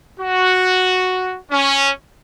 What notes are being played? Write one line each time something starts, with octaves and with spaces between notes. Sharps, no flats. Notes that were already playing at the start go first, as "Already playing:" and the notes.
F#4
C#4